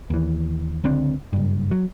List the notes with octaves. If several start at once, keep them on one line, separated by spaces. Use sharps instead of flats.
D#2 E3
C#2 D3 C4 D4
F#1 G2
F#3